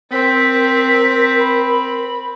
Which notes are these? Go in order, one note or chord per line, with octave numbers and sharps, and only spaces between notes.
C4 A#4 B6
B5